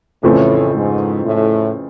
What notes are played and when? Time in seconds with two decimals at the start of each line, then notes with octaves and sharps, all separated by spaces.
0.23 F2 A2 C#3 E3 A3 C4
0.74 G#2
1.24 A2